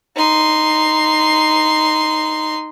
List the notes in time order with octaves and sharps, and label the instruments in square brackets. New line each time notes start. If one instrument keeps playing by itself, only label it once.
[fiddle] D#4 C6